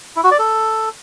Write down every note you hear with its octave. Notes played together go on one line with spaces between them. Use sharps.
E4
F#4
D5
A4